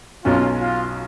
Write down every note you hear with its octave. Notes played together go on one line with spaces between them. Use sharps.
B1 B2 F#3 C#4 F4
F4